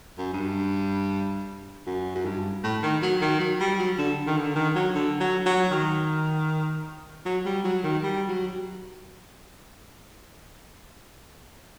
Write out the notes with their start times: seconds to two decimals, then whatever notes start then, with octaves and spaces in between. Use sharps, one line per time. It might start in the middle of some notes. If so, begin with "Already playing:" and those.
0.18 F#2
0.33 G2
1.86 F#2
2.15 F#2
2.25 G2
2.64 A2
2.83 D#3
3.02 F#3
3.21 D#3
3.40 F#3
3.60 G3
3.79 F#3
3.98 D3
4.27 D#3
4.37 D3
4.55 D#3
4.75 F#3
4.95 D3
5.20 F#3
5.46 F#3
5.71 D#3
7.25 F#3
7.45 G3
7.64 F#3
7.83 D#3
8.03 G3
8.28 F#3